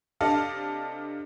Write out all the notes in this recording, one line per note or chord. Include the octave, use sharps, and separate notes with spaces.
C3 D4 A4 D#5 F5